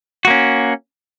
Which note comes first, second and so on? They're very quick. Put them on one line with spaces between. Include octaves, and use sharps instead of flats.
F#4 A#3 C#4